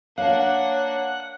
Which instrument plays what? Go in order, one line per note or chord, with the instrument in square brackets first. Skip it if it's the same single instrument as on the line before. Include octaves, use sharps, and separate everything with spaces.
[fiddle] A#3 D4 [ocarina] C#5 [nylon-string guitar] F5 A5 [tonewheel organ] F#5